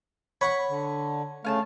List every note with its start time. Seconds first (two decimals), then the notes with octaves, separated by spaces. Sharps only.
0.41 C#5 F#5 B5 C#6
0.70 D3
1.45 C#3 A3 F5 G#5 A5